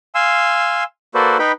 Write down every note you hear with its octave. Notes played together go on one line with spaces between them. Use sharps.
F5 G#5 C6 E6
A#3 F#4 A4 B4 C5 D5
D#4 B4 G5 B5